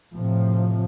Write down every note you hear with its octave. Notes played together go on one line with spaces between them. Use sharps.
A2 C3 F3